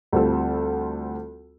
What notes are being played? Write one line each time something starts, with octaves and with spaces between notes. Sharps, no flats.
D2 G3 C4 F4 A4